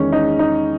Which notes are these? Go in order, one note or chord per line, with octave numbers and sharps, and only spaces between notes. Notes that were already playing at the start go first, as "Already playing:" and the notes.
Already playing: E2 D#3 G#3 C#4
D#4
D#4